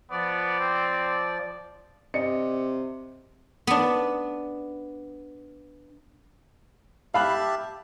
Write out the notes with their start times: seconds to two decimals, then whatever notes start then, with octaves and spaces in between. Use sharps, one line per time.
0.11 F3 B3 D5
0.60 C4
2.14 C3 D5 D#5 C#7
3.67 B3 D4
7.14 G4 E5 F5 A5 B5 F#6